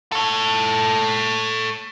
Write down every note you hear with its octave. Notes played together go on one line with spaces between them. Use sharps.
A4 C#5